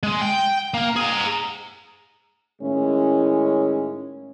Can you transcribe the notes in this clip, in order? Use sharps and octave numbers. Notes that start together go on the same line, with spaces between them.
G#3
G5
A#3
G#4 A#5
A2 D#3 G#3 C#4 E4